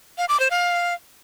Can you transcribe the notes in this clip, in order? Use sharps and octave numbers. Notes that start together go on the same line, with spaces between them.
F5
D6
C5
F5